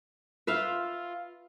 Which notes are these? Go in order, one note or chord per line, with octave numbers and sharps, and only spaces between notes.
F4 B4 E5 F5